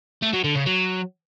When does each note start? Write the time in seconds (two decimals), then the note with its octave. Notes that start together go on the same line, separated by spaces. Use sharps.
0.22 A3
0.33 F#3
0.44 D3
0.55 C#3
0.66 F#3